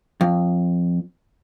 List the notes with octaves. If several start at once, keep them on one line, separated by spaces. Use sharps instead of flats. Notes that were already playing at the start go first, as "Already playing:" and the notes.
F2